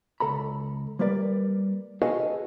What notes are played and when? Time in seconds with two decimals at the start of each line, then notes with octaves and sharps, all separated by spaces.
0.20 C#2 A4 A#5 B5
0.99 G3 A#3 A#4 B4 D5
2.02 F#4 G#4 A4 B4 D#5 F5